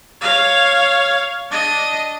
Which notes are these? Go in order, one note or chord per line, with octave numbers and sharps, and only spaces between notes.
C#5 F5
D4 D#5